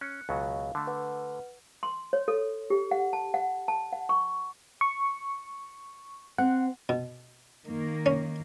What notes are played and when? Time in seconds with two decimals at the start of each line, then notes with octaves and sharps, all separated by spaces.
0.01 C#4 F#6 C#7
0.29 C#2 B2 F#3 F5
0.75 D3 A3
0.87 B4 F#5
1.83 C6
2.13 C#5
2.28 A4
2.70 G4
2.91 F#5
3.13 A5
3.34 F#5
3.68 A5
3.93 F#5
4.09 C#6
4.81 C#6
6.38 C4 F#5
6.89 B2
7.66 D#3 A#3
8.06 C#4